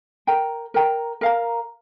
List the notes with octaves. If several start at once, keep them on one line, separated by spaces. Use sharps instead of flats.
A#4 G5 A#5
A#4 G5 A#5
A#4 F5 A#5